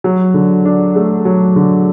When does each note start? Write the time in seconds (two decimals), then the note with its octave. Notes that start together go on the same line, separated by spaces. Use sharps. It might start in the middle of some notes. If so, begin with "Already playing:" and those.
0.04 F#3
0.34 D3
0.65 D4
0.96 A3
1.25 F#3
1.56 D3